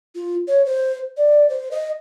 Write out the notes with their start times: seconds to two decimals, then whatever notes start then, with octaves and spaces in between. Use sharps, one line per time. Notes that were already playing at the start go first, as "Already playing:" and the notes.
0.15 F4
0.48 C#5
0.66 C5
1.17 D5
1.50 C5
1.71 D#5